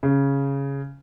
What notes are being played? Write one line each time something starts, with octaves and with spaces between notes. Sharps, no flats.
C#3